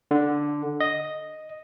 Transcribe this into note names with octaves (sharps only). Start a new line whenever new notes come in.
D3
D#5